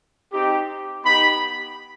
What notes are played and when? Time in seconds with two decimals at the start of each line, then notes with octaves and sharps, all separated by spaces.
0.32 C4 D#4 G4
1.05 B3 D#4 G4 B5